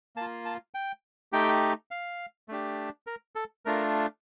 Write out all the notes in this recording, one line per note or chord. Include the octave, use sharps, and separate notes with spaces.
A#3 A5
F4
A5
G5
A3 D#4 G4 G5
F5
A3 D4 G4
A#4
A4
A3 D4 F4 A#4